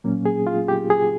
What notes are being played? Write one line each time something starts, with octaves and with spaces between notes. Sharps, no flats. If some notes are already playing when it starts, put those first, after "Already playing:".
A#2 F#3 A#3 C#4
G#4
F4
G4
G#4